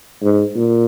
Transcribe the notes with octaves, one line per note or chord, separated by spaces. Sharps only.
G#2
A#2